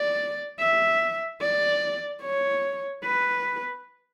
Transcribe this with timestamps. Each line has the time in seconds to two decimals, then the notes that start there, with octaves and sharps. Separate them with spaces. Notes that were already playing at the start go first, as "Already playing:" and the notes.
Already playing: D5
0.59 E5
1.41 D5
2.22 C#5
3.04 B4